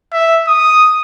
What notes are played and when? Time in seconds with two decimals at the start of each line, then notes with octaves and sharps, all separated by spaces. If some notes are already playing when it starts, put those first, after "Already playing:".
0.13 E5
0.47 D#6